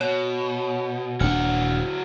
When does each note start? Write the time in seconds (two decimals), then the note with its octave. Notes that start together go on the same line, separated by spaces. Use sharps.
0.01 B2 C#5
1.20 D#1 F#3 D4 E4 F#5 F6